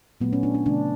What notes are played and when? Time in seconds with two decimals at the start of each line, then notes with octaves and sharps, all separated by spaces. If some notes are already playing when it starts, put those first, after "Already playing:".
0.21 A#2 F#3 A3 B3
0.33 C#4
0.43 D4
0.54 D4
0.66 C#3 E3 A3 D4